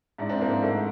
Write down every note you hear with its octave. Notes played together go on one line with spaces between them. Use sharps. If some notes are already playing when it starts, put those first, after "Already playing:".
G#2 D4 E4
C4 D4
G#2 A#3 C4
G#2 A3